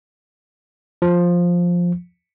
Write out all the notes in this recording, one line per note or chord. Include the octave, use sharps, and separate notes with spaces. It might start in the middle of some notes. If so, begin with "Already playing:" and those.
F3